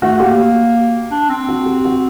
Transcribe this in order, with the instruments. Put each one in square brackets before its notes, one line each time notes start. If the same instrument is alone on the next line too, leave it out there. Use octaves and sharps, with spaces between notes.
[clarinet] A3 [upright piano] F#4
[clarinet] A#3 [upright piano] G4
[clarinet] D4
C4
[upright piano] F#4
G4
F#4